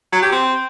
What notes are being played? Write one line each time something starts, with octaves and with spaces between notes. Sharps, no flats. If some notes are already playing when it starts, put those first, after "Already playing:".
F#3
G4
C4